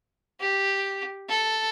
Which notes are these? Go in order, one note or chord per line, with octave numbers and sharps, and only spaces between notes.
G4
A4